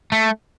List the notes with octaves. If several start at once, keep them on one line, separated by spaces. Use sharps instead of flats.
A3